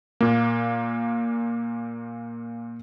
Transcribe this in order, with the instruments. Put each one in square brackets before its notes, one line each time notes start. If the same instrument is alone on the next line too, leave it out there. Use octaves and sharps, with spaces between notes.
[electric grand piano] A#2 A#3